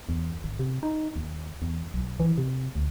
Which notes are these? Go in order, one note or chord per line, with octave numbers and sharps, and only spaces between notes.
E2
G#1
C3
D#4
D#2
E2
B1
E3
C3
D2